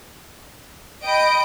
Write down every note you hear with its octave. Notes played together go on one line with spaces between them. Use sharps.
D#5 G5 B5 D7